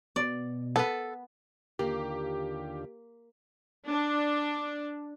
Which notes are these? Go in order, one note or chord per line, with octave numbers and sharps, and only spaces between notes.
B2 D5
B3 A4 B4
D#2 D3 A#3 F4 G4
D4